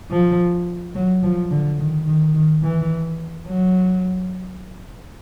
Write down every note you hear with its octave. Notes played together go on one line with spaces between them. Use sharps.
F3
F#3
F3
D3
D#3
D#3
D#3
E3
F#3